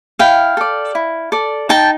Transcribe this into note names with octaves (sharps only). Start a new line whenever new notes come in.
E4 F5 G5
A4 D5
E4
A4 D5
D#4 G5 A5